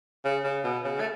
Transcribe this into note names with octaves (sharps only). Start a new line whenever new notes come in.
C#3
C#3
B2
C#3
A3